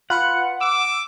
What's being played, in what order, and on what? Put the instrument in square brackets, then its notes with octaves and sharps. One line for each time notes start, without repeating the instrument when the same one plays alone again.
[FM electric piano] F4 B4 C#7 [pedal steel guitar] F#5
[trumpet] D6 [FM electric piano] E6